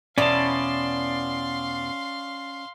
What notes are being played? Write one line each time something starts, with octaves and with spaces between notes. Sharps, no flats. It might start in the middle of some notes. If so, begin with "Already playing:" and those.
E2 B2 C#4 E4 D5 F5 A5 C6